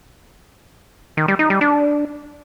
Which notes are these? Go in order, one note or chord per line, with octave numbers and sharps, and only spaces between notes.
D#3
G3
D#4
G3
D4